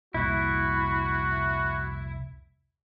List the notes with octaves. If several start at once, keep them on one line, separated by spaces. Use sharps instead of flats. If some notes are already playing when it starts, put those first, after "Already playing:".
F1 C2 A#2 E4 F#4